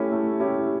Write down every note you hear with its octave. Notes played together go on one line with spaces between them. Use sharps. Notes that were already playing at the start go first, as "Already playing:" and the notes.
Already playing: A3 C#4 E4 G4
A3
C#4 E4 G4